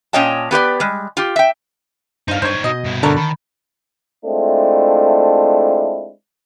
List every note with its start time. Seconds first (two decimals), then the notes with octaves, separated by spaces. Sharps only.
0.13 A#2 C#4 C#5 D#5 G5 A5
0.51 B3 G4 B4 D5
0.80 G3 G#3
1.17 F4 G4
1.36 E5 G5
2.28 G2 C#4 D#4 C5 F5
2.42 G2 C5 C#5 G6 G#6
2.64 B2 D#5
2.85 G2 E4
3.03 D3 A#4 C#5 A5
3.17 D#3 B5
4.25 G#3 A3 C4 D4 E4 F4